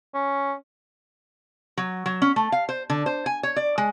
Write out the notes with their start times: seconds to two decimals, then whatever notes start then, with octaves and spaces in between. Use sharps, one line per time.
0.14 C#4
1.77 F#3
2.06 F#3
2.22 C#4
2.36 A3
2.52 F5
2.69 C5
2.90 D3
3.06 C5
3.26 G#5
3.43 C#5
3.56 D5
3.78 G#3